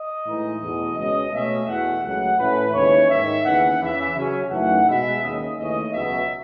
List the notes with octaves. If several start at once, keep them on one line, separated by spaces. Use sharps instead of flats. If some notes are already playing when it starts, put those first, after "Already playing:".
Already playing: D#5
A2 E3 G#3 D#4
E2 B2 A3
C#2 B2 G#3 C#4 D#5
B2 A3 C#4 E5
E2 B2 A3 F#5
C#2 C#3 F#3 A3 C#4 F#5
A2 E3 A3 C#4 B4
D#2 C#3 E3 G#3 C#4 C#5
G#2 D#3 G#3 D#4 E5
D#2 C#3 E3 B3 F#5
E2 C#3 E3 E5
C#3 F#3 C#4
F#2 E3 A3 D#4 F#5
B2 G#3 B3 E5
D#2 C#3 G#3 D#5
D#2 C#3 E3 A3 C#4 D#5
C#2 B2 F#3 E5